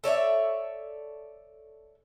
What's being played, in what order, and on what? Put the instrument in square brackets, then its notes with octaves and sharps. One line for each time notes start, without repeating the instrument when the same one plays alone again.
[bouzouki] A4 C#5 D5 E5